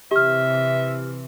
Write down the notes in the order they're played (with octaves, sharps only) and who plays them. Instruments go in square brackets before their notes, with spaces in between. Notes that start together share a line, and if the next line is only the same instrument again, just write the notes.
[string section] C3 E3 [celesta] G4 F6 [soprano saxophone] E5